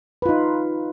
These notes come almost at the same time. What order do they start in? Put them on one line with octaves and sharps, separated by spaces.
B4 F4 D#4